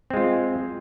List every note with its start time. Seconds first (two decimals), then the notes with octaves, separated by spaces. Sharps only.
0.10 C4
0.14 G#3
0.17 F4